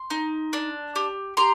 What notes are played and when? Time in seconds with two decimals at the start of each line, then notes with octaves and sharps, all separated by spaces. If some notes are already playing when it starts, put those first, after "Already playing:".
Already playing: C6
0.10 D#4
0.53 D4
0.96 G4
1.37 G4 A#5 C6